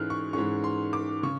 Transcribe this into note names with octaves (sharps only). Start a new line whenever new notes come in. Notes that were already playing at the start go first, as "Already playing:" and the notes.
Already playing: G#2 E3 G#3 C#4 F6 F#6
C#6
G#2 E3 G#3 C#4 C#6
C6
D6
C#3 C#6